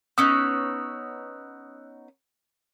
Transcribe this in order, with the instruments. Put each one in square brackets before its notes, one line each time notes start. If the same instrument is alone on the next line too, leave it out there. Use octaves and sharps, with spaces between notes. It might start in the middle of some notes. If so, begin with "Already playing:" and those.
[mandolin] B3 C#4 D#4 [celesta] D#6 [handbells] E6 F#6